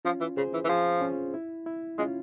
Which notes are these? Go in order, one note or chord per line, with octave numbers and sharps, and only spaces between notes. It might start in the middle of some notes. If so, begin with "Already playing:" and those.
F3 C#4 F4
E3
C#3 G#4 C5
E3
E3
F3 G#4 C5
C#4 F4
E4
E4
G#3 C#4 F4